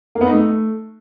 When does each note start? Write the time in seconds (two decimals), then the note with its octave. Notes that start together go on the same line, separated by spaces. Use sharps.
0.15 A#3
0.21 B3
0.27 D#4
0.32 A3